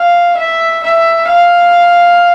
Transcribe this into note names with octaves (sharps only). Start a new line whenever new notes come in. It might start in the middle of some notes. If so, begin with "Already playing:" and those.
Already playing: F5
E5
E5
F5